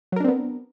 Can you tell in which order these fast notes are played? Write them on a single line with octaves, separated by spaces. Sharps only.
F#3 A#4 D4 C4 B3